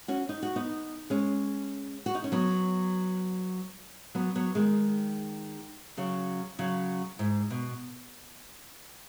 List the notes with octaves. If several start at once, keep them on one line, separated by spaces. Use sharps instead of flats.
C#4 F#4
D#4
F#4
B3 D#4
G#3 C#4
F#4
D#4
C#4
F#3 B3
F#3 B3
F#3 B3
D#3 G#3
C#3 F#3
C#3 F#3
G#2
B2